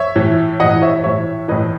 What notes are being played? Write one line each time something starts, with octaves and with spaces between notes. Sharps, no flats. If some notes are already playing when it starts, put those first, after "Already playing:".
Already playing: C#5 E5
A2 E3
A2 E3 D#5 F#5
C#5 E5
A2 E3 C#5 E5
A2 E3 B4 D#5